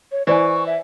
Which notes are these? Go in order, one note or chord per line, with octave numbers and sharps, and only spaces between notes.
C#5
E3 C5 D5 G#5 C#6
E5